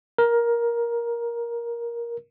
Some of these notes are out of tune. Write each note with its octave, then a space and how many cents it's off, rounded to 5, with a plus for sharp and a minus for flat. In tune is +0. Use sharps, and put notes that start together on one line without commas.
A#4 +15